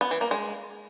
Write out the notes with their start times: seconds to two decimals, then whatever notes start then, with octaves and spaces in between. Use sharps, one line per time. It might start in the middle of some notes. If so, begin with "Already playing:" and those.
0.01 B3
0.11 E3
0.21 A#3
0.31 G#3